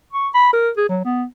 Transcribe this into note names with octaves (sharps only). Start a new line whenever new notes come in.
C#6
B5
A#4
G#4
F#3
B3